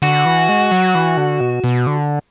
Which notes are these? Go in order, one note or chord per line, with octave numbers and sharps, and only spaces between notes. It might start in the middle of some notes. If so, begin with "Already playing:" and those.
D3 F#4
E3
G#3
F#3
E3
D3
B2
B2
D3